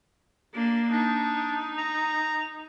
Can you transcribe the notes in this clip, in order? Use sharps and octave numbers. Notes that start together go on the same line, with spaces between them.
A#3 D4
D4 D#4
A#5